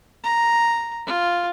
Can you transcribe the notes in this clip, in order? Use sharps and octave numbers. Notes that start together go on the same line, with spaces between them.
A#5
F4